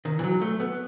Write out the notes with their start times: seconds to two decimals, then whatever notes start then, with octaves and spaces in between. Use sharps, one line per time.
0.05 D#3
0.19 E3
0.24 F#3
0.41 A3
0.60 B3